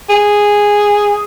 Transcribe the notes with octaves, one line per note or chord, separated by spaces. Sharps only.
G#4